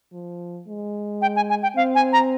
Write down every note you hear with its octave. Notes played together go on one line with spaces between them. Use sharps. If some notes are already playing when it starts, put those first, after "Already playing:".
F3
G#3
G5
G#5
G#5
G5
C4 F5
G#5
A#5